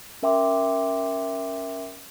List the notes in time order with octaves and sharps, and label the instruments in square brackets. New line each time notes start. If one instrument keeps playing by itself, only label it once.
[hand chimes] C#4 A#4 E5 G5 C6 D6